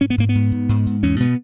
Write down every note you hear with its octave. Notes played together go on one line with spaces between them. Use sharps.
G#2 C#4
B3
G#2 A#3
B3
G#2
G#2
G#2
G#2
E2 C#4
B2 B3